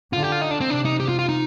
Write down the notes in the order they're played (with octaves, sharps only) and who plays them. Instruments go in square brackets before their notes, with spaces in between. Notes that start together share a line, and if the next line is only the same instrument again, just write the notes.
[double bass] D3 [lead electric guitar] F4
[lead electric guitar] G4
F4
D#4
D4
C4
[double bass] C3 [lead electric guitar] D4
[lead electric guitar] D#4
G4
F4
F4
D#4